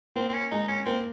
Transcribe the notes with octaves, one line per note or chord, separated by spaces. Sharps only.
A#3 C4
C4
C#4
G#3 D#4
C#4
A#3 C4